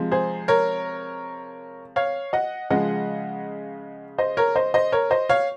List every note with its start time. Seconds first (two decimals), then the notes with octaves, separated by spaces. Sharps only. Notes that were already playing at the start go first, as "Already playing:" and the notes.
Already playing: C3 F3 G#3
0.11 G#4 C5
0.48 A#4 C#5
1.96 C#5 F5
2.33 D#5 F#5
2.70 C#3 F3 G#3 D#5 F#5
4.18 C5 D#5
4.37 A#4 C#5
4.56 C5 D#5
4.74 C5 D#5
4.92 A#4 C#5
5.11 C5 D#5
5.29 C#5 F5